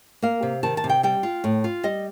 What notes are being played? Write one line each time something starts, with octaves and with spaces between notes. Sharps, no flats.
A#3 F5
C3
D#3 A5
A5
C3
G5
G3 G5
F4
A2
F4
G3 D#5